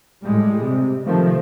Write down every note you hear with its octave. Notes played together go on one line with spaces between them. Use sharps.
A2 G3 G#3
C3
C3 D#3 F3 A3